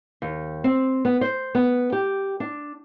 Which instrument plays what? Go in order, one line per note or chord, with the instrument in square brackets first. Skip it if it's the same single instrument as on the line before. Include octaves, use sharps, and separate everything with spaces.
[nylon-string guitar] D#2
C4
B3
C5
B3
G4
D4